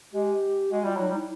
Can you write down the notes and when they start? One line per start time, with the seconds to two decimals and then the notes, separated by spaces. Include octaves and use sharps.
0.13 G#3 G4
0.71 G#3 F#4
0.84 G3 F4
0.97 F#3 D#4
1.10 G3
1.15 E4